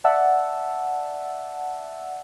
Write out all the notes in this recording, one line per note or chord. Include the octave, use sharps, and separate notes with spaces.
D5 E5 F#5 A5 E6